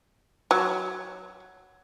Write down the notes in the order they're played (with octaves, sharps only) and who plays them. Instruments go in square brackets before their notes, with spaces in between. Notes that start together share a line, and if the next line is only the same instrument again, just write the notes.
[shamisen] F#3